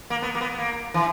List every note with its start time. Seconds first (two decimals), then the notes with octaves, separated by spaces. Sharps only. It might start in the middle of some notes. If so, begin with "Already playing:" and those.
0.10 A#3
0.22 B3
0.35 A#3
0.41 B3
0.58 A#3
0.94 E3